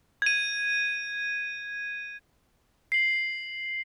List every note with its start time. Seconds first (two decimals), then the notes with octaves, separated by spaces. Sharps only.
0.22 G#6 D#7
2.92 C7 F#7